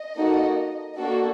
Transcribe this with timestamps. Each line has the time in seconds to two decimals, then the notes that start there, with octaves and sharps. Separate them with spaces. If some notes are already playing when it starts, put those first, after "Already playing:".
Already playing: D#5
0.16 A#3 D#4 F#4 A4
0.97 A#3 D4 F#4 A4